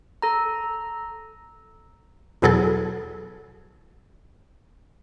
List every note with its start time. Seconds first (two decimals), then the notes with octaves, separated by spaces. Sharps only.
0.22 A4 A#5
2.42 E2 B2 F#3 G#4 A4